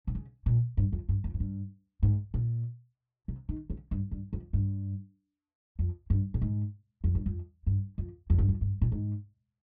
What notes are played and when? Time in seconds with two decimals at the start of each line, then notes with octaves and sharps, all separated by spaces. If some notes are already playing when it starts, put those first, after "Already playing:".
0.07 C3
0.15 C#3
0.46 A#2
0.77 G2
0.92 F2
1.09 G2
1.24 F2
1.34 G#2
1.40 G2
2.03 G#2
2.34 A#2
3.28 C3
3.49 D#3
3.70 C#3
3.91 G2
4.11 G2
4.33 F2
4.53 G2
5.79 F2
6.10 G2
6.34 A#2
6.42 G#2
7.04 F2
7.15 G2
7.26 F2
7.67 G2
7.98 F2
8.30 F2
8.38 G2
8.49 F2
8.61 G2
8.82 A#2
8.92 G#2